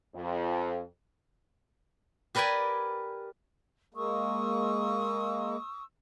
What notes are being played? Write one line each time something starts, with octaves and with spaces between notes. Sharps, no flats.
F2
G4 A#4 B4 D5 G5 G#5
G#3 A#3 C#6 D#6 E6